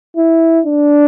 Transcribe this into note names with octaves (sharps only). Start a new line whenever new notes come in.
E4
D4